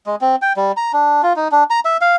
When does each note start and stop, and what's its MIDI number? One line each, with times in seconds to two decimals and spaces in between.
0.06 0.15 56
0.21 0.36 60
0.42 0.53 79
0.57 0.72 55
0.77 0.92 82
0.93 1.22 62
1.23 1.33 65
1.36 1.48 63
1.52 1.64 62
1.70 1.80 82
1.85 1.97 76
2.01 2.16 77